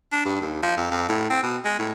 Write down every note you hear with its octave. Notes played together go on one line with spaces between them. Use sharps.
D4
G2
D#2
F3
F2
F2
A2
C4
B2
G#3
A2